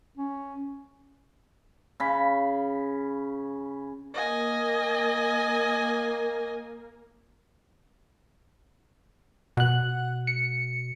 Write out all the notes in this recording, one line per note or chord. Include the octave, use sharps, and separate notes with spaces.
C#4
C#3 B5
A#3 D#5 G#5
B2 F#5 F#6
C#7